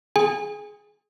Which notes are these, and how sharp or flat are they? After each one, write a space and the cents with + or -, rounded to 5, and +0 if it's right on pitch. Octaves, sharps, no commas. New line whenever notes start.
G#4 +15 G#5 -30